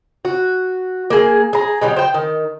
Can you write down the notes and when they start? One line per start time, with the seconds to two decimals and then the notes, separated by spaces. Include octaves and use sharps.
0.25 F#4
1.10 A#3 G#4
1.53 G#4 A#5
1.82 B2 F#3 G3
1.96 C5 G5
2.14 D#3